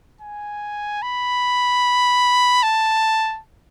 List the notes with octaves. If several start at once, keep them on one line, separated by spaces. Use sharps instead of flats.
G#5
B5
A5